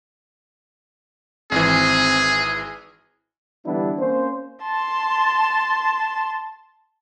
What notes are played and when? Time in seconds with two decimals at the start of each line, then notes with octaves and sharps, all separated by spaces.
1.52 G#1 E3 C4 G#4
3.65 D3 E3 G3 B3 D4 E4
3.99 A#3 C4 C#4 C5
4.64 A5 C6